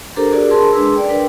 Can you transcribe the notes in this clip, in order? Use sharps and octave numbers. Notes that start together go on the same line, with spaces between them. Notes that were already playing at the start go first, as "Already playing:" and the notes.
D4 G4 A4 A#4 C5 A#5
D4 F#4 G#4 A#4 D5
G#4 A#4 A5 C6
G#3 D4 G#4 B4 C6 E6
D5 G5
D4 A#4 B4 G5